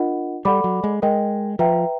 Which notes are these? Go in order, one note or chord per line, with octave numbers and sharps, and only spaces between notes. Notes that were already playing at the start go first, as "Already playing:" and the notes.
Already playing: D4 F4 A#4 D#5 F#5
G3 A4 D5 F#5 B5 D6
F#3
G#3
G#3 A#4 D#5 G5
F3 B4 E5 G5 A#5